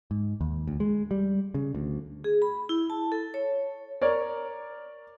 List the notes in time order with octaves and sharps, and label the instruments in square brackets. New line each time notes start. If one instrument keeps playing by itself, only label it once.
[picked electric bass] G#2
D#2
D2
G#3
G3
C#3
D2
[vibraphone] G#4
B5
E4
A5
A4
C#5
[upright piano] A#4 C#5 D5